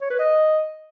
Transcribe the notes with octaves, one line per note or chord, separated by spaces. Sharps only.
C#5
B4
D#5